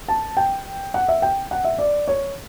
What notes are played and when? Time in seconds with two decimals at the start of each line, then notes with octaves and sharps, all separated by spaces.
0.08 A5
0.37 G5
0.94 F#5
1.08 E5
1.22 G5
1.51 F#5
1.64 E5
1.79 D5
2.08 C#5